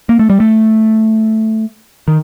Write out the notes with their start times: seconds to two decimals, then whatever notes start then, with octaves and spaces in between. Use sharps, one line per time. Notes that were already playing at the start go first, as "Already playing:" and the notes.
0.09 A#3
0.19 A3
0.30 G3
0.40 A3
2.08 D#3